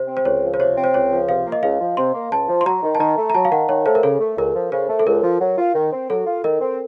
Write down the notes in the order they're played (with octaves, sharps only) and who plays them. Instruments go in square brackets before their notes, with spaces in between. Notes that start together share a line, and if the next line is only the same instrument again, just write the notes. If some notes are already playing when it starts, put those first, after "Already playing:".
Already playing: [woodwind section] C3 [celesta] C5
[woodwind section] C4
[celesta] C5
[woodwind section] C#2 [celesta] C#5
[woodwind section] F3
[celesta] C5
[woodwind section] C3 [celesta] C#5
[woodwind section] C4
[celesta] C5
[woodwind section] C#2 [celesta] C#5
[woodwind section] F3
[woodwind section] C3 [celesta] F5
[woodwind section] A#3
[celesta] D#5
[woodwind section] C#2 [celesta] F5
[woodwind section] F3
[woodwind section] C3 [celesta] C6
[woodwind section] A#3
[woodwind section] C#2 [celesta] A5
[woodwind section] F3
[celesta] C6
[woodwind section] F#3 [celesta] A#5
[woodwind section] D#3
[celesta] A5
[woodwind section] D#3 [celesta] A#5
[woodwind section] A3
[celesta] A#5
[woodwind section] F#3 [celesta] A5
[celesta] F5
[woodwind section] D#3 [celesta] F#5
[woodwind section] D#3 [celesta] C#5
[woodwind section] A3 [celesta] C5
[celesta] A#4
[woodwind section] C#3 [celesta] A4
[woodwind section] A3
[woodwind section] C#2 [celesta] A#4
[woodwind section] F3
[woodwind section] C#3 [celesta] C5
[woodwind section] A3
[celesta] A4
[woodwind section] C#2 [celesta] A#4
[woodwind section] F3
F#3
F4
D#3
C4
[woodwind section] F#3 [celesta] A4
[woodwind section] F4
[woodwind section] D#3 [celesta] A#4
[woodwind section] C4